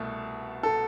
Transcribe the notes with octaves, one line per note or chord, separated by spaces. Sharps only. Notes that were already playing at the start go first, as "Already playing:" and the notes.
Already playing: C2 B2 A3
A4